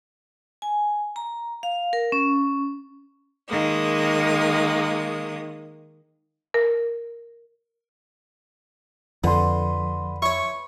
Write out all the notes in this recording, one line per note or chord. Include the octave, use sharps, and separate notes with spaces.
G#5
A#5
F5
A#4
C#4
D#3 G#3 A#3 D#6
A#4
F2 D3 B4 C6
E4 C#5 C#6